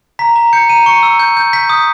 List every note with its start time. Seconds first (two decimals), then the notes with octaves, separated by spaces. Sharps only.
0.19 A#5 B6
0.36 A#5
0.53 G6 C#7
0.69 A#5 D#7
0.86 C#6 C#7
1.03 E6
1.19 G6
1.37 G6
1.53 G6 B6
1.70 D#6